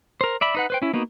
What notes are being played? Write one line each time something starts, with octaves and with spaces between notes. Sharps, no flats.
A#4 C5
D5 E5 B5
D#4 B4 F#5
B4 C5 G5
C#4 E4
A#3 B3 D#4 F#4